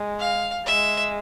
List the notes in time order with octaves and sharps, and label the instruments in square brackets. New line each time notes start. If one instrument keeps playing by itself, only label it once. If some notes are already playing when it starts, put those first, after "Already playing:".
Already playing: [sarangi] G#3
[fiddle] F5
[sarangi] G#3 [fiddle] E5